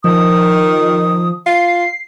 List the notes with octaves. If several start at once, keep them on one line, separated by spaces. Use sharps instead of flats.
D#3 F3 D#6
F4 C7